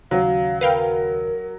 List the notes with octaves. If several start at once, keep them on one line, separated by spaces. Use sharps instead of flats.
D#2 C#3 F#3 F5
A#4 B4 F5 G5